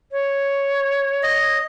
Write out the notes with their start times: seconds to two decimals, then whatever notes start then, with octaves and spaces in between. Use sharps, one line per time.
0.11 C#5
1.23 D#5